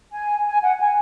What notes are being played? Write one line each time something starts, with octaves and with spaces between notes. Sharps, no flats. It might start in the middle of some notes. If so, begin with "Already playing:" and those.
G#5
G#5
F#5
G#5